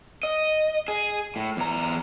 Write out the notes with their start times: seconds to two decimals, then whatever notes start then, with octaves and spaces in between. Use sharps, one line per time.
0.23 D#5
0.88 G#4
1.36 A2
1.57 E2 A#5